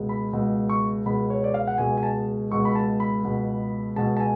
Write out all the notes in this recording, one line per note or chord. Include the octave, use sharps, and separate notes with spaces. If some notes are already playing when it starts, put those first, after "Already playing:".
Already playing: C#2 B2 G#3
B5
C#2 B2 G#3
C#6
C#2 B2 G#3 B5
C#5
D5
F5
F#5
C#2 B2 G#3 G#5
G#5
A5
C#2 B2 G#3 C#6
B5
A5
B5
C#2 B2 G#3
C#2 B2 G#3 A5
A5
G#5